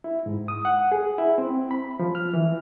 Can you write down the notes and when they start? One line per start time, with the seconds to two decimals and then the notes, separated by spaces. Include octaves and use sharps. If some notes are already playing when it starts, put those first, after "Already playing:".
0.04 E4
0.26 G#2
0.48 D#6
0.65 F#5
0.92 G#4
1.18 E4
1.38 C4
1.71 B5
1.99 F3
2.15 F6
2.33 E3